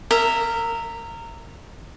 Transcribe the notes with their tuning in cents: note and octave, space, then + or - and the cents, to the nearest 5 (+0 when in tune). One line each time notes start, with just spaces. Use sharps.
A#4 -20 E5 +0